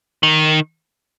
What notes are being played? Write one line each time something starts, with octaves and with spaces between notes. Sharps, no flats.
D#3